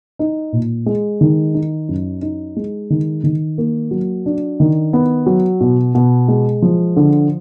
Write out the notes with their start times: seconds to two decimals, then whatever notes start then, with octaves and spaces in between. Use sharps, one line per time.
0.19 D#4
0.52 A#2
0.86 G#3
1.21 D#3
1.54 D#4
1.89 F#2
2.22 D#4
2.56 G#3
2.90 D#3
3.24 D#3
3.58 A#3
3.91 F#3
4.26 D4
4.60 D#3
4.93 B3
5.26 F#3
5.61 B2
5.95 B2
6.28 G#3
6.62 F3
6.96 D3